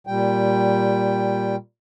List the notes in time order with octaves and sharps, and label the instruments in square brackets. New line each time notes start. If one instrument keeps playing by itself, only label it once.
[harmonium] A#2 G3 G5